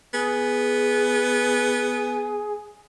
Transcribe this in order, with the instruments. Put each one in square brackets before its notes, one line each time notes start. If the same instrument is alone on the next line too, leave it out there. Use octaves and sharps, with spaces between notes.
[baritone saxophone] B3 [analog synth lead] G#4